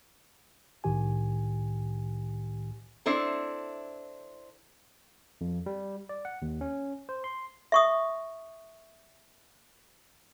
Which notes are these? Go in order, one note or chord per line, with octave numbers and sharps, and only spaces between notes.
C2 A2 D#3 G4 G#5
C4 D4 E4 A4
F2
G3
D5
F#5
D#2
C#4
C5
C6
E5 C#6 D#6